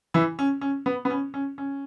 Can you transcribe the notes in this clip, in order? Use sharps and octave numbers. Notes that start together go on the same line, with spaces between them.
E3 E4
C#4
C#4
B3
B3
C#4
C#4
C#4